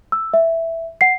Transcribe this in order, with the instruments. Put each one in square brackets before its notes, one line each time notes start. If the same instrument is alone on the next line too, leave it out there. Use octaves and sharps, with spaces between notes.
[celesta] E6
E5
F#5 C7